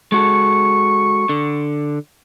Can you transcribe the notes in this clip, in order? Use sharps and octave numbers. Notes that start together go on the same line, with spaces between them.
G#3 F#4 A4 C#6
D3